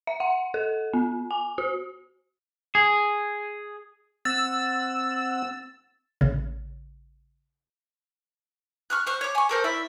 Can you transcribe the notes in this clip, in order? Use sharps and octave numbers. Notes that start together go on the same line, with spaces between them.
E5
F#5
A4
B3
G#5
F#4
G#4
C4 F#5 E6 A6
A1 C#3
C#6 F6 F#6
C5 C#6
C#5 D6
G#5 C#6
A4 A#4 C5
E4 D5 E5